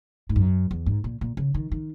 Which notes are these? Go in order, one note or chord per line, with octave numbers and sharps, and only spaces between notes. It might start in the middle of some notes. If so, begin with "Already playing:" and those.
G#2
F#2
E2
G#2
A#2
A#2
C#3
D#3
D#3